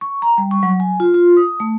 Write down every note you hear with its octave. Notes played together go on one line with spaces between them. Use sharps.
C#6
A#5
G3
C#6
F#3
G#5
F4
F4
D#6
A3